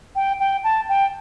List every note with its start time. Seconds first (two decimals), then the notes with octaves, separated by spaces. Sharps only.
0.16 G5
0.40 G5
0.64 A5
0.89 G5